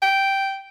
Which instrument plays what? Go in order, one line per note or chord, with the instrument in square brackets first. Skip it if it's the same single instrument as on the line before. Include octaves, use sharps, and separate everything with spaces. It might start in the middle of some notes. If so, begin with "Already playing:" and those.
[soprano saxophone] G5